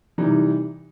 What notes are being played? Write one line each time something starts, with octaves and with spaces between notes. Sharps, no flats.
C3 E3 G3 D#4